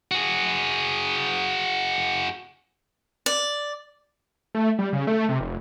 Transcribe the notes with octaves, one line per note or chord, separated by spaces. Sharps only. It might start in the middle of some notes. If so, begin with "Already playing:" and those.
F#4 G#4
D5
A3
G3
C#3
A3
C3
F1